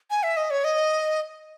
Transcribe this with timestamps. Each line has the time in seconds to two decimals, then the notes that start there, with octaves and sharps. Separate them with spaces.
0.10 G#5
0.23 E5
0.37 D#5
0.50 C#5
0.64 D#5